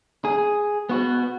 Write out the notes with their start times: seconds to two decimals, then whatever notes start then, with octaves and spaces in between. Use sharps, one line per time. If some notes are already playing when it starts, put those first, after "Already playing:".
0.25 G#4
0.89 B3 F#4